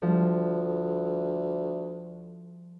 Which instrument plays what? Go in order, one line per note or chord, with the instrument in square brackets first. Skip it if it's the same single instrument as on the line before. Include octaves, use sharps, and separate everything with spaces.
[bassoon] D2 [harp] F3 G3